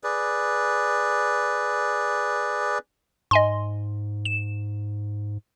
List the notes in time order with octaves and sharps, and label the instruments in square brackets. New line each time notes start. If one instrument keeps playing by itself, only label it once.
[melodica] G#4 B4 D5
[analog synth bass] G#2 [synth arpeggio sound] D#5 G#5 C6
[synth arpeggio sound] E7